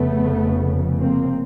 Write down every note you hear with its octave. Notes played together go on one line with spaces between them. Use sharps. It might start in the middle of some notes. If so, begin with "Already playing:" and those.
Already playing: F1 F2 C#3 A3 B3
A#3 C4